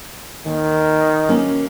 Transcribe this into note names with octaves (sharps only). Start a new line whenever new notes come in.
D#2 D#3
F#3 A#3 C#4